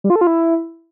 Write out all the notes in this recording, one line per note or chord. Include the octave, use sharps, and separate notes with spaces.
G3
F4
A4
F4
E4